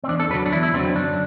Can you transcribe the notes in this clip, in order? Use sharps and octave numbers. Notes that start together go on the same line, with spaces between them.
C4
E2 D4
A4
D3 F#3 B4
D4
E2 E4
E4
D3 F#3 C4
C4
F#2 D4